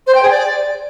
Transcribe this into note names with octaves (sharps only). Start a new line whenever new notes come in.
C5
G5
G#4
D5